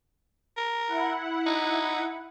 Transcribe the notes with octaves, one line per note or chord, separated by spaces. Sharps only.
A#4
E4 F#5
D#4